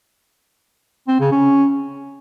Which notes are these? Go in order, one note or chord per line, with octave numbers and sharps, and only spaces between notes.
C4
C#3
C#4